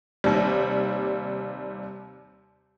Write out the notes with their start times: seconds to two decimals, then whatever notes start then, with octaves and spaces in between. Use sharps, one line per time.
0.24 D#2 C3 G3